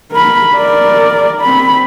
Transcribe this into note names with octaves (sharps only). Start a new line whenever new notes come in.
A#4 B5
A#4 D5
C4 B5